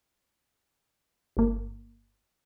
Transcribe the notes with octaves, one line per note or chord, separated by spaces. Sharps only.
G1 A#3